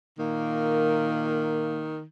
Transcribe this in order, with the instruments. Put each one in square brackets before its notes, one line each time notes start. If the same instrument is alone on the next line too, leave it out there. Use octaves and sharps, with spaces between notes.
[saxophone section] A#2 A#3 [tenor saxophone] D#3